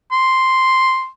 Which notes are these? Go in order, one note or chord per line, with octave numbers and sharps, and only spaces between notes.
C6